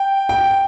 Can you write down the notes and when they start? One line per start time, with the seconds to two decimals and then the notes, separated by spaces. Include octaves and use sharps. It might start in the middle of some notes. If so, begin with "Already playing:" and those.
Already playing: G5
0.29 G5